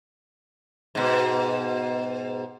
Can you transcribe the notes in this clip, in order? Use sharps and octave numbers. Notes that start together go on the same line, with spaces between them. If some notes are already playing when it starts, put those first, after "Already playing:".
G#2 B2